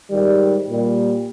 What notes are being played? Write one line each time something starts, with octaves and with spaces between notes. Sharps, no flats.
G#2 D#3 G3
A#2 G3